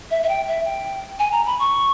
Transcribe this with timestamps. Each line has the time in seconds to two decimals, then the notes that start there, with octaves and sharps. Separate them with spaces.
0.11 E5
0.23 E5
0.29 G5
0.48 E5
0.65 G5
1.19 G#5
1.32 A#5
1.46 B5
1.59 C#6